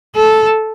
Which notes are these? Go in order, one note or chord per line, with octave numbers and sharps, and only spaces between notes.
A4